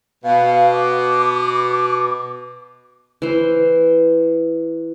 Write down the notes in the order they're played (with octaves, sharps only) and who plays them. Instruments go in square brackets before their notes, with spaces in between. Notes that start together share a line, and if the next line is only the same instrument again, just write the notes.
[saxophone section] B2 [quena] F5
[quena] D6
[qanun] E3 C5